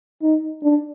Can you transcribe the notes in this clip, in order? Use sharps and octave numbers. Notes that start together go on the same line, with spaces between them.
D#4
D4